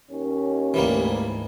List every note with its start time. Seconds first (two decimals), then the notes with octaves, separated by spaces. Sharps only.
0.12 D#2 C#4
0.74 D2 G#2 E3 G3 A#3